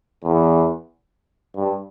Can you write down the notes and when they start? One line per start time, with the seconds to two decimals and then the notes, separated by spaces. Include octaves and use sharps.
0.24 E2
1.56 G2